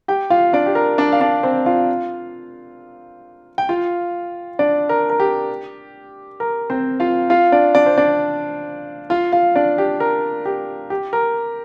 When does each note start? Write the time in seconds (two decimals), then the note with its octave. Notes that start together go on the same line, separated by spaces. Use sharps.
0.08 G4 G5
0.30 F4 F5
0.53 D4 D5
0.66 G4
0.75 A#4
0.98 D4 D5
1.12 F5
1.21 D4 D5
1.43 C4 C5
1.66 F4 F5
3.58 G5
3.69 F4 F5
4.59 D4 D5
4.89 A#4
5.10 A#4
5.20 G4
6.40 A#4
6.70 C4 C5
7.00 F4 F5
7.30 F4 F5
7.52 D4 D5
7.75 D4 D5
7.86 C5
7.98 D4 D5
9.10 F4 F5
9.32 F4 F5
9.56 D4 D5
9.78 G4
10.00 A#4
10.45 G4
10.90 G4
11.13 A#4